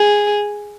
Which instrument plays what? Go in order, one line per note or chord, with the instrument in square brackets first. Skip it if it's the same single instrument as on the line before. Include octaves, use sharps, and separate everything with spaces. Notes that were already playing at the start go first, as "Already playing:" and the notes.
Already playing: [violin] G#4